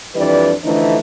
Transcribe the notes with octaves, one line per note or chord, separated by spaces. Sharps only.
F2 E3 G3 D4 B4 D5
D3 E3 F3 A3 D4 D#4